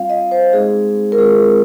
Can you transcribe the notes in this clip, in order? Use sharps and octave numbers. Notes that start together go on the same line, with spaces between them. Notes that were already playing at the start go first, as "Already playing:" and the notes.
Already playing: G3 C4 F4 F5
D#5
C5
G#3 C4 D#4 G#4
A#4
G#3 C4 F4 G#4